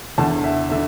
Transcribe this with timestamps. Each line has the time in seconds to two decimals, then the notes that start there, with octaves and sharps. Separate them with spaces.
0.18 E2 D3 A5
0.44 E5
0.70 D3 E5